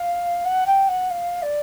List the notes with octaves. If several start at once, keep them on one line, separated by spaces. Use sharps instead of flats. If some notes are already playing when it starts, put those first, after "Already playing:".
Already playing: F5
F#5
G5
F#5
F5
D5